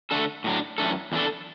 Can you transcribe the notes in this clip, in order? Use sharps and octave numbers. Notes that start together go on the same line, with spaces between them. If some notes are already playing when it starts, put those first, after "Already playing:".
D3 A3 D4 A4
A2 F#3 D4
F#2 E3 A3 D4 A4
E2 E3 D4 A4